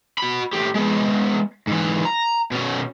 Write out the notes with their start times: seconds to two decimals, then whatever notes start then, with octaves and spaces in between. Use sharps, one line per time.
0.18 F#4 B5
0.53 A2 G4
0.76 G#3 B3
1.67 G#2 E3
2.05 A#5
2.52 B2 C#4